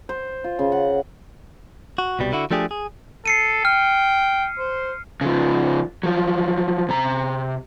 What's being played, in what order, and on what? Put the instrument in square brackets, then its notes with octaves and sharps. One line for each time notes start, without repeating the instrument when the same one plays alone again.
[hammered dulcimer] C5
F4
C#3
F#5
[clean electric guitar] F#4
C2 B2 G3
D3 E4 F#4
F3 A3 D4 G4 G#4
G#4
[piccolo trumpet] A4 [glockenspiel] C7 C#7 D#7
[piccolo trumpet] G5 [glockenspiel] F6
[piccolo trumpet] C5
[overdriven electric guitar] C#3 F3
F3 F#3
C3 A#5